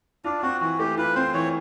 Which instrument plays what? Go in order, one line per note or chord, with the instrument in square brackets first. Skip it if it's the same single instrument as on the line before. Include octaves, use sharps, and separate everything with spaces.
[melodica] D4 [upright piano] F4
[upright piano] C4 [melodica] F#4
[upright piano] E3 [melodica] F#4
[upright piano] A3 [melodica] G4
[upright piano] F4 [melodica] B4
[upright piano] C4 [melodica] C5
[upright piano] E3 [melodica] C#5